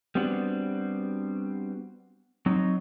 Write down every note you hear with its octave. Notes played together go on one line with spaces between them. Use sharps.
G3 B3 C4 D4 F#4
F#3 C4 D#4